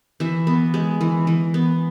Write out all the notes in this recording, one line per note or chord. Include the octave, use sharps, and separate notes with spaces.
E3 E5
B3
G#3
E3
E3
B3